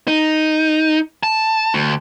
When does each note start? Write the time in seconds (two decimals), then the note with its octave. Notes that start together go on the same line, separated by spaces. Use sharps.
0.08 D#4
1.23 A5
1.74 D2